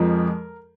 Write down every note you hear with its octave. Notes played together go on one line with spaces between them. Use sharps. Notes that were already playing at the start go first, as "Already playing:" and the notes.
Already playing: F2 F3 G#3 A#4